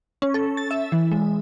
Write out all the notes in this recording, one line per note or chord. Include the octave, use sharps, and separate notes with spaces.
C#4
A4
A6
E5
E3
G#3